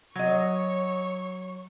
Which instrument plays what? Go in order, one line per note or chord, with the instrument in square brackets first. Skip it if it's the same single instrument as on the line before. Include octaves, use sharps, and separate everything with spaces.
[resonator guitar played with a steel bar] F#3 D#5 [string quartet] C#5 C#6